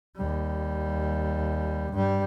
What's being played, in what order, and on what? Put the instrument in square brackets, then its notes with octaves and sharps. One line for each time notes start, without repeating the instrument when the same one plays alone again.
[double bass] D#2 G3
G2 G3